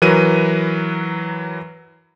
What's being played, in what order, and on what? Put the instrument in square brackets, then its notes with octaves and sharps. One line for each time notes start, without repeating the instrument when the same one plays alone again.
[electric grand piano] E3 F#3 A#4 B4 D#7